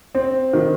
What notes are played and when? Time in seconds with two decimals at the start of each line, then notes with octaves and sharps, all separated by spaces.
0.15 C4
0.53 D#3